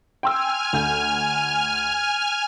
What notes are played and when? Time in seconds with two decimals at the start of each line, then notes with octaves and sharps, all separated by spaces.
0.23 G5 G#5 C6 E6 F6
0.73 D2 G6